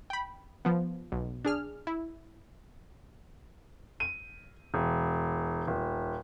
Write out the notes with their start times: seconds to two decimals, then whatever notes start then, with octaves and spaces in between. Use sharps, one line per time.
0.10 G5 B5
0.65 F3 B3
1.12 B1
1.45 D4 G#4 F6
1.87 E4
4.00 D#7
4.74 E1
5.67 D#1